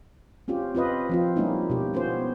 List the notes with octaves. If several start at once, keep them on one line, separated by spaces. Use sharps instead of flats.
C4 C#4 F4 G4
C4 F4 B4 D#5
F3 C4 F4
G3 G#3 A#3 C#4 D#4 E4
B2 G4
B3 C#4 F4 C5